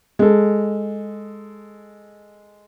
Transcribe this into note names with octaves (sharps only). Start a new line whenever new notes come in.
G#3 A4